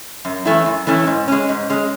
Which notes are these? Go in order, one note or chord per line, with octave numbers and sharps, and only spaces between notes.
F#2
E3 A3 C#4 E4
F#2
E3 A3 C#4 E4
G#2
G#3 C#4
G#2
G#3 C#4